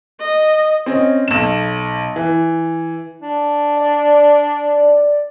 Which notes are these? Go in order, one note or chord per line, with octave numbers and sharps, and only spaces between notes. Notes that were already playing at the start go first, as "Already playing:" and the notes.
D#5
C4 C#4 D#5
B1 E7
E3
D4
D5